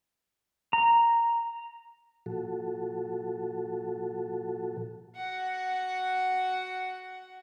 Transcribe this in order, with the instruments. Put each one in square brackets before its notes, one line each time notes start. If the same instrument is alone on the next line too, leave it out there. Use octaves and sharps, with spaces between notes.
[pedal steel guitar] A#5
[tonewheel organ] A#2 F3 F#4 A4
[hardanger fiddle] F#4 F#5